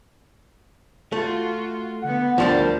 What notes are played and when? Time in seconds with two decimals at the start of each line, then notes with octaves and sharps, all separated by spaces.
1.12 A3 F4 F#4
2.02 D3 B3 F#5
2.38 D2 F3 G3 D4 A#4